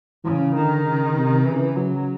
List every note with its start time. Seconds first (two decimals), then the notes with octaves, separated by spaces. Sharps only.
0.24 C#3 E3
0.55 D3 D#3
0.85 C#3
1.16 C3
1.45 C#3 E3
1.76 F#3